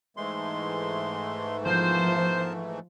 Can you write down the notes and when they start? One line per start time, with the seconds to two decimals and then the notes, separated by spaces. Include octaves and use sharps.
0.17 G#2 E3 G#3 A3 C6
1.66 F3 B3 A#4 C5 A5